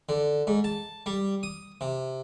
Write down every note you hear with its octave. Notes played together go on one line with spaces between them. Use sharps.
D3
G#2
A5
G3
D#6
C3